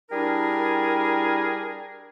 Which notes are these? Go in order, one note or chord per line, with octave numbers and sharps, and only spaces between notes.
G3 D4 E4 G#4 A#4